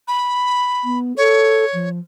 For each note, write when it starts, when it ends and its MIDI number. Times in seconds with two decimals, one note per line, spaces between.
0.08 0.99 83
0.84 1.16 59
1.17 1.65 69
1.17 1.89 73
1.73 1.99 53